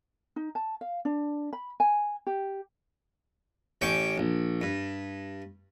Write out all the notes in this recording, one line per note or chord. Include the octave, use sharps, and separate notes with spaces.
D#4
A5
F5
D4
B5
G#5
G4
A1 C#4 G5 D6
A#1
G2